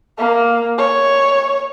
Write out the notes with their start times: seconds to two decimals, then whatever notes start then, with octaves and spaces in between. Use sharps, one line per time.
0.18 A#3
0.78 C#5